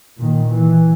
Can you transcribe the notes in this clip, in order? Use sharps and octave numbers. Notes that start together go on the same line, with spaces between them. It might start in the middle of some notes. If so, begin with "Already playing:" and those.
A#2 D#3
E3